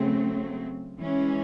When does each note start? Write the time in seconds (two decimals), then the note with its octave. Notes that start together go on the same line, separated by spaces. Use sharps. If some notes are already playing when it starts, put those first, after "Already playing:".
Already playing: C#3 F#3 A3 C4
0.99 E3 G#3 C#4